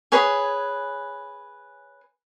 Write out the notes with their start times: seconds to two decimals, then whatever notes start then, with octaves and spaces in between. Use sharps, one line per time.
0.12 G#4 B4 C#5 G#5